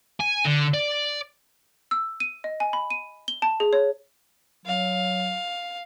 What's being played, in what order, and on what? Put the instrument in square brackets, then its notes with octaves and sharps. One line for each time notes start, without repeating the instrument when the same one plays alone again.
[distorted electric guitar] G#5
D3
D5
[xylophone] E6
D#7
D#5
G#5
B5
D#7
G7
A5
G#4
C#5
[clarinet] F#3 [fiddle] F5